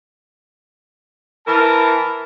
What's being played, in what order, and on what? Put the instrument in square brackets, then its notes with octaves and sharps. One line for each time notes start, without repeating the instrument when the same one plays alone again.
[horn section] E3 A#4 A5